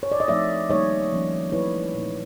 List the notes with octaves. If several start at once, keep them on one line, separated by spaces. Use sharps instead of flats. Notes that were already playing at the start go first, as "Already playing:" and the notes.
C#5
D5
D#5
F3 A3 C4 D#4 D5 E5
D#3 G3 A#3 D#4 C#5 D#5
F3 A#3 C#4
E3 A3 C4 E4 B4 C#5
A#2 F3 A#3 D#4